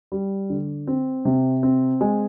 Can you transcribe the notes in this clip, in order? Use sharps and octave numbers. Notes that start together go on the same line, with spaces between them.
G3
D3
C4
C3
C4
G#3